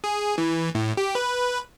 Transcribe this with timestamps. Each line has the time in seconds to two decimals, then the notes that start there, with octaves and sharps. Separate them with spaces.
0.04 G#4
0.38 E3
0.75 A2
0.97 G4
1.15 B4